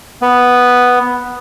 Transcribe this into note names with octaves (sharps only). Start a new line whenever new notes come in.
B3